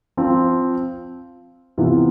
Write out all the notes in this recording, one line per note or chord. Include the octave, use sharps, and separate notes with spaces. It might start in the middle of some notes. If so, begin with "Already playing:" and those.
F3 C4 F4
C3 E3 B3 F4